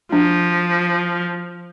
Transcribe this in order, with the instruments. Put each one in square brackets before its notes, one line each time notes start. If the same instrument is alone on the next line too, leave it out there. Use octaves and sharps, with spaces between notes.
[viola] F3 [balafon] D4